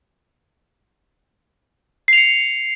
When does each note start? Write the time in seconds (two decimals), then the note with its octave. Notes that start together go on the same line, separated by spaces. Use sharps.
2.08 C7
2.13 F7
2.18 C#7